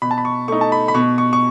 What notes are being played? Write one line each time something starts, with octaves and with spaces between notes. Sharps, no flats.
B2 B5
A5
B5
C#6
A3 D#4 C#6
A5
B5
B5
B2 C#6
C#6
C#6